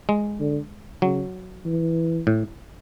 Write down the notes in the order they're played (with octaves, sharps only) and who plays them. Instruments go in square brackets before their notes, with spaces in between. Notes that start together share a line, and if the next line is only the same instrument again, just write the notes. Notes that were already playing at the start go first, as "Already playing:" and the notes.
[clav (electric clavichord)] G#3
[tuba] D3
[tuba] C#3 [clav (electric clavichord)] F#3
[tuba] E3
[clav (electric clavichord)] A2